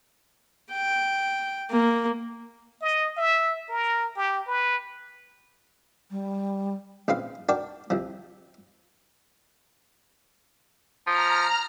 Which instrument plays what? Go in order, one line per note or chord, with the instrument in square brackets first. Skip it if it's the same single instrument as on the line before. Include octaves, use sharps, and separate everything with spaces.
[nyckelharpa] G5
A#3
[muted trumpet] D#5
E5
A#4
G4
B4
[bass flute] G3
[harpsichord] A#1 C#3 C4 B4 F5
D4 F#4 A#4 D5 G5
C2 F3
[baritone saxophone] F3 [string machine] A#5 F6